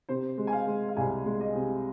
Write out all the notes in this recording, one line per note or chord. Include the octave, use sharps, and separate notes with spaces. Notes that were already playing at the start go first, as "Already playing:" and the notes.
C3 C5
G#3
G#5
F5
G#3
F5
C2 G#5
G#3
D#5
C3